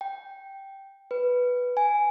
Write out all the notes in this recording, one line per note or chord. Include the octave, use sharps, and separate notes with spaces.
G5
B4
G#5